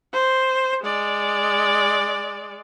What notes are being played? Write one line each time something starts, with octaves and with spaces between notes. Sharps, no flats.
C5
G#3 D5